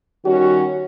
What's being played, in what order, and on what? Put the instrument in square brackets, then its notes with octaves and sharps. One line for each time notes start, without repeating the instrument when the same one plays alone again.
[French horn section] D#3 G3 C#4 F#4